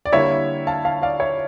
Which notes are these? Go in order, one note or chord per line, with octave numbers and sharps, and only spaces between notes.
D5
D3 G3 A#3 E4 C#5 E5
F5 A5
F5 A5
D5 F5
C#5 E5